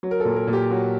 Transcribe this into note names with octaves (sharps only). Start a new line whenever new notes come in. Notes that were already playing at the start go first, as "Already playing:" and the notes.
F#3
A#4
A4
A#2
A#4
A#2
G4
F#3 F#4